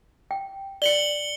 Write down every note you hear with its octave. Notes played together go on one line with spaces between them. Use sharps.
G5
D5 C#7 F#7 G7